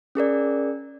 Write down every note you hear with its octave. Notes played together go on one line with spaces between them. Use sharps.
C#4 G#4 A#4 D5